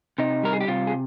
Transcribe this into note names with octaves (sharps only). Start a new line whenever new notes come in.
C3 D#4
G3 A#4
G#4
G4
C3 F4
G#4